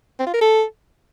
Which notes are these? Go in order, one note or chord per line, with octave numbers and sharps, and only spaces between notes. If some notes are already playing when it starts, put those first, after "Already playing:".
C4
F4
A#4
A4